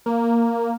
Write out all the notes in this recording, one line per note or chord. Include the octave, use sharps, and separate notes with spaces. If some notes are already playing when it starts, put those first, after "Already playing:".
A#3